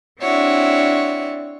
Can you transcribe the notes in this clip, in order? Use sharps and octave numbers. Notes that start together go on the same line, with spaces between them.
C4 D4 E4 F#4 C#5